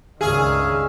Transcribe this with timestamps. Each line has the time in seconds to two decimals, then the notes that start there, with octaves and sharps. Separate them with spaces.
0.21 C#2 G2 D#3 C#4 G#4 E5 F5